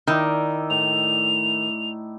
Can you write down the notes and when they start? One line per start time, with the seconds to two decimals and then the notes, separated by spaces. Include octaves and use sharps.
0.07 D#3 D#4 E4 D5
0.70 A2 F7